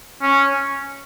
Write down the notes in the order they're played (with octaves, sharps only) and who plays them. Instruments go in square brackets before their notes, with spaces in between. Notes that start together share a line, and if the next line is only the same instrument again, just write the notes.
[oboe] C#4